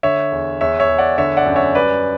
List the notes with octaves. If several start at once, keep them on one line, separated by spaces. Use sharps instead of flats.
D3 C#5 E5
E2
E2 C#5 E5
C#5 E5
E2
D5 F#5
D3 C#5 E5
D5 F#5
F#2
C#5 E5
G3 B4 D5